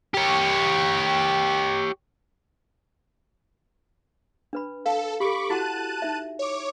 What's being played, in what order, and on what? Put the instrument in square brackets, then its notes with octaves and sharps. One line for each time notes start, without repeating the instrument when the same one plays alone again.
[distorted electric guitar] G4 C#5
[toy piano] D4 B4 B5
[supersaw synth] A4 [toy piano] F5
[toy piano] G4 A4 [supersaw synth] B5 C#6 D6
[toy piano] E4 F#4 F#5 [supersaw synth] A5 F#6 D#7
[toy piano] D#4 E5
[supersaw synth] C#5 D6